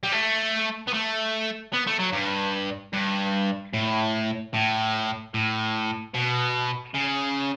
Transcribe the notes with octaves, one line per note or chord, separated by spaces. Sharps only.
G3
A3
B3
A3
B3
A3
F#3
G2
G2
A2
A2
A2
B2
C#3